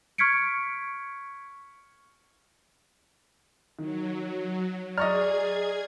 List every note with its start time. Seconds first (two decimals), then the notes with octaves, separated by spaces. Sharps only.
0.18 C#6 F6 G#6 B6 C#7 D7
3.79 D#3 F#3
4.98 G#4 D5 D#5 A#5 C#6 F6 G#6